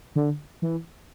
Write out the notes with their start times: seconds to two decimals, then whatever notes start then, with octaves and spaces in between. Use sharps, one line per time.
0.16 D3
0.62 E3